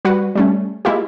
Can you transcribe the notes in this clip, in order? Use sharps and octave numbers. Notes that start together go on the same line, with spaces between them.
G3 F#4 B4 F#5
G3 A3 C#4
G#3 A#3 E4 F4 G4